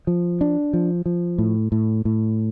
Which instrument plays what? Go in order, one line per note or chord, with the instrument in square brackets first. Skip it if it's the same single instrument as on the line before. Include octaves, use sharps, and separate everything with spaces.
[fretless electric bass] F3
D4
F3
F3
A2
A2
A2